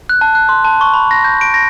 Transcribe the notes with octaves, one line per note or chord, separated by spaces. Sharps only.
F#6
A5
F#6
C6
A5
C#6
B5
A#6
G6
D7
A#6